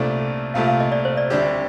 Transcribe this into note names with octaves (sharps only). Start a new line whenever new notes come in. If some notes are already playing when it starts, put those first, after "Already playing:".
Already playing: C2 A#2 A3 D4 A4 F5
C2 A#2 A3 F5
F5
D#5
D5
C5
D5
D2 C3 G3 D4 G4